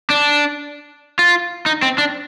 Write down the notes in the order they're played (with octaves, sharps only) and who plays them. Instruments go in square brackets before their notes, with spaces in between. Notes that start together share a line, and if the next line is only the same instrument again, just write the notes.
[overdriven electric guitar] D4
F4
D#4
C4
D4